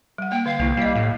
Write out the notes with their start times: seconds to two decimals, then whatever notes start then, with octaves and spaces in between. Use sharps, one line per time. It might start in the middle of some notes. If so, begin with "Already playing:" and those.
0.18 G3 F#5
0.32 A#3 G5
0.46 D3 F5
0.59 C2 A#3 E4
0.77 G3 A#3 D#5
0.95 A2